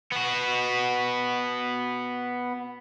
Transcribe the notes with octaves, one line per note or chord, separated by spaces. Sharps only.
B3 F#4